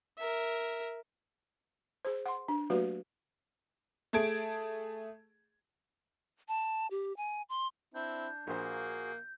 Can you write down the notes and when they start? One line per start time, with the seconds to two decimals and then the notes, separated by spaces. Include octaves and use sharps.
0.18 A#4 E5
2.05 G#4 C5
2.26 F#5 C6
2.48 D4
2.70 F#3 A3 A#3 F#4 G4 B4
4.13 A3 G#4 A5 G#6 D7
6.48 A5
6.91 G4
7.17 G#5
7.49 C6
7.94 C4 D4 E4 G6
8.47 A#1 A#3 F#4 G#4 C5